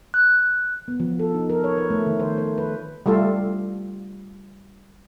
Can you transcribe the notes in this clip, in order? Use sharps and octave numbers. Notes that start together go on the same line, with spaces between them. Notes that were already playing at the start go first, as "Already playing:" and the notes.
F#6
B3
F3
A4
D#4
A#4
C#5
B4
A3
D#3
C5
C5
B4
G3 A3 F4 A4